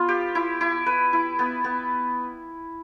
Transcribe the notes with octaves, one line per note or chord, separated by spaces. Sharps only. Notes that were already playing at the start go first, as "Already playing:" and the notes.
Already playing: B3 F4
G4
E4
E4
B4
E4
B3
B3